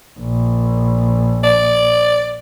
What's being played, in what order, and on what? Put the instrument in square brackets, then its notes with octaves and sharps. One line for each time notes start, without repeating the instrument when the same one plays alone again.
[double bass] A#1
[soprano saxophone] D5